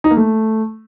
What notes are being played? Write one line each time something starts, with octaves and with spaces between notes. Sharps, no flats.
D#4
A#3
A3